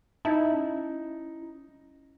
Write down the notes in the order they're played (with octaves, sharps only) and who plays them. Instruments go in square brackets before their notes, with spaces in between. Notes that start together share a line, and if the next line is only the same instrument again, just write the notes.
[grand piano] D#4 [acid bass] E4 [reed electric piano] E5 A5
[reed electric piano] C#4